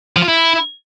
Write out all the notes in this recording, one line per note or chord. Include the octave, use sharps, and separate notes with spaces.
F3
F4
E4